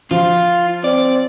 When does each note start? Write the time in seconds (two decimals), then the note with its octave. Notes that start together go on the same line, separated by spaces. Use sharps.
0.11 F3 F4
0.84 C4 D5